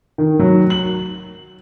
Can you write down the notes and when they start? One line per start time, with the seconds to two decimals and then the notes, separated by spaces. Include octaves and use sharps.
0.18 D#3
0.39 F#3
0.70 F#7